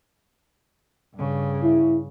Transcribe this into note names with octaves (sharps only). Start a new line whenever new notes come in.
G2 C#3
E4